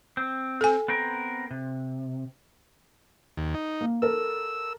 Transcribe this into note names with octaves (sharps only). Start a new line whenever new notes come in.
C4
A4 G#5
B3 C4 A#4
C3
D#2
D#4
A#3
A4 A#4 E6